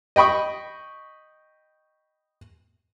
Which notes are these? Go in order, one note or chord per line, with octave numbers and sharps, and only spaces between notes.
D#5 G5 B5 C#6 D#6